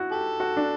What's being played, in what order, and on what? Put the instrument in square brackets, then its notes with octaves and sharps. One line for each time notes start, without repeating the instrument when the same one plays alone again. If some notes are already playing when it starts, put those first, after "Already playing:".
Already playing: [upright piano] E4 F#4
[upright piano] G4 [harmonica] A4
[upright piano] F#4
D4